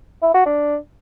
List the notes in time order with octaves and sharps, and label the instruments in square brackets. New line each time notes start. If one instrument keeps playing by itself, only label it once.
[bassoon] E4
F#4
D4